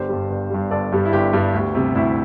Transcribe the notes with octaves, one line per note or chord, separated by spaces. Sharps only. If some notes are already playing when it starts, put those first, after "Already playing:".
Already playing: G1 G4 C5
G2 G3
G1
G2 G3
G1 A4 D5
G2 G3
E4
G1 G4
G2 G3
D2
C3 G3
D2 E4